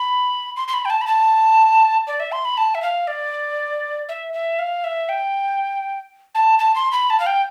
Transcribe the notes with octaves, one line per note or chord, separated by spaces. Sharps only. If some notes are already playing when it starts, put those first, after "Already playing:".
Already playing: B5
C6
C6
B5
G5
A5
B5
A5
D5
E5
C6
B5
A5
E5
F5
D5
E5
E5
F5
E5
G5
A5
A5
C6
B5
A5
F5
G5